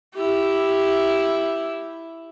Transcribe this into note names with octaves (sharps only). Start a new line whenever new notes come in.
E4 G4